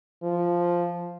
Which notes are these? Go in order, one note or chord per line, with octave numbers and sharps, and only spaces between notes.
F3